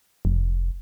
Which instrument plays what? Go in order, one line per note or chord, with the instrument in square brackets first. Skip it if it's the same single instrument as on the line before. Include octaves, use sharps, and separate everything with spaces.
[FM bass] F1